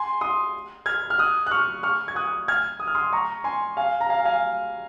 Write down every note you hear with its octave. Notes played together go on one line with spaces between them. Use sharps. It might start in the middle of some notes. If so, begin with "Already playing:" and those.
Already playing: G#5 C6
C6 D#6
F6 G#6
F6
D#6 F#6
F#6
C#6 F6
C#6 F6
G#6
D#6 F#6
F6 G#6
D#6
F6
C6 D#6
A#5 C#6
G#5 C6
F5 G#5
A#5
F5 G#5
F5 G#5